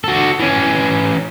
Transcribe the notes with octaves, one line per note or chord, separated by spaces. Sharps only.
F#4 A4
E3 C#4